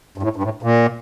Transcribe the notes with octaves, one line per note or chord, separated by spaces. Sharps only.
G2
A2
G2
A2
A#2